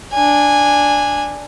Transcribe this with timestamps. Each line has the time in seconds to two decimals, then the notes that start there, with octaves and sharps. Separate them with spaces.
0.13 D4 G#5